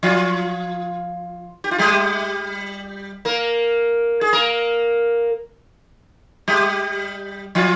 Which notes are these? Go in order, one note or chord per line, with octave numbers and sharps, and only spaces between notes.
F3 F4
G4
F4
G3 G4
A#3 A#4
G#4
A#3 A#4
G3 G4
F3 F4